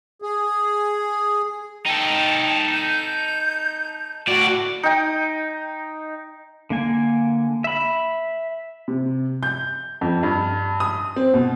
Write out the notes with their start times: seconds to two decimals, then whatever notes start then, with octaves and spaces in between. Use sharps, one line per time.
0.22 G#4
1.86 D#4 A4 G5
2.72 G6
4.27 A2 F#4 D5
4.83 D#4 G5
6.70 D3 A#3 G#5
7.64 E5 B5
8.88 C3
9.43 G6
10.01 F2
10.23 G2
10.80 D#6
11.16 C4
11.34 B2